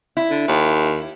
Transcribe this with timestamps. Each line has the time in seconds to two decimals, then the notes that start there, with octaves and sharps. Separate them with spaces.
0.17 E4
0.30 D3
0.48 D#2